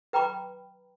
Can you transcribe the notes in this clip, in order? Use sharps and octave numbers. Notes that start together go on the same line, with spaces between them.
B4 G5 A#5 B5 D6